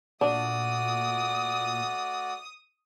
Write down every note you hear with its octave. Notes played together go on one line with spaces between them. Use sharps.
A#2 A3 D4 F#4 D5 D#6